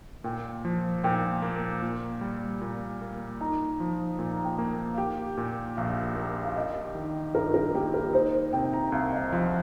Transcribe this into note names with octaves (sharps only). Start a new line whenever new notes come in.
A#2 G5
F3
A#2 G5
A#3
A#2
G3
A#2
A#3
D#4 A#5
F3
A#2
A#5
G5
A#3 A#5
F5
G4 G5
A#2
A#1 F5
A#3
F5
G4 D#5
D#3
G2 A#4
A#4
A#3 G4
A#4
D#4 C5
C3 G5
A#5
C2 F5
D#5
F3 F5